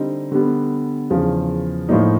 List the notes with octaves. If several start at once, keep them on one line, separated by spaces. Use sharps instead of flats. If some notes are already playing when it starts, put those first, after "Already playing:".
Already playing: D3 G3 C4 D#4
D3 G3 B3
E2 C#3 F3
A2 F3 A#3 D#4